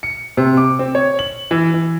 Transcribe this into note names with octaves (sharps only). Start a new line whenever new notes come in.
C#7
C3
D6
C4
C#5
F#7
E3
E3